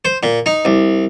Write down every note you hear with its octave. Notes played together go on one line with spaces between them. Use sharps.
C5
A#2
D#4
C2